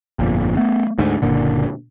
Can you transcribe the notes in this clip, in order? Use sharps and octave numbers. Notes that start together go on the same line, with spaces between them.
G1 F2 A#2
A3 B3
D2 G#2
F#1 A#2 D3